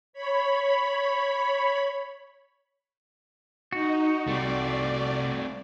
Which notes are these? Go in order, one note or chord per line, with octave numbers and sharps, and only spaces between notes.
C#5 B5
D#4 F#4
C2 A3 C4 D5